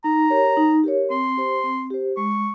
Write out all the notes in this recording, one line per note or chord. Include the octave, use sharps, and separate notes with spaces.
D#4 A#5
G4 A#4 C#5
D#4
G4 A#4 C#5
C4 C6
G4 C5
C4
G4 C5
G#3 C#6